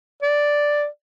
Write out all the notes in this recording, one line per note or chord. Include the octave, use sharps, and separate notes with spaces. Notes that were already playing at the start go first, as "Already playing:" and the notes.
D5